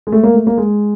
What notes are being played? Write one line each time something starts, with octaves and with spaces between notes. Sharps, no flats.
G#3
A3
A#3
A3
A#3
G#3